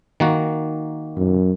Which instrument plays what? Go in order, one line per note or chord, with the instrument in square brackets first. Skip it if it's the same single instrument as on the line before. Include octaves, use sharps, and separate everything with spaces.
[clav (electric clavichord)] D#3 A#3 F#4
[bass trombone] F#2